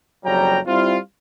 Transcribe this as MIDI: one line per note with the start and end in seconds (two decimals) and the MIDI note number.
0.25 0.59 30
0.25 0.59 41
0.25 0.59 54
0.25 0.59 55
0.25 0.59 79
0.25 0.59 82
0.67 0.98 55
0.67 0.98 60
0.67 0.98 64
0.67 0.98 65